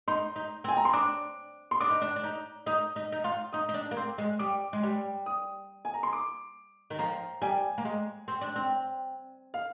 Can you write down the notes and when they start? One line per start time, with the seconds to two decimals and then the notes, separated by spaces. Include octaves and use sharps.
0.08 D#4 C6
0.36 D#4
0.64 C4
0.68 G#5
0.77 A#5
0.85 C6
0.93 D4 D6
1.71 C6
1.80 D4 D6
1.90 D#4
2.01 D4
2.16 D4
2.24 D#4
2.66 D#4 D#6
2.96 D#4
3.12 D#4
3.24 F4
3.53 D#4 D#6
3.69 D#4
3.74 D4
3.91 A#3
3.97 C4
4.18 G#3
4.39 G3 D6
4.73 G#3
4.83 G3
5.26 D#6
5.85 G#5
5.94 A#5
6.03 C6
6.13 D6
6.90 D#3
6.99 F3 A#5
7.42 G3 G#5
7.78 A#3
7.85 G#3
8.28 C4
8.41 D4
8.56 C4
9.54 F5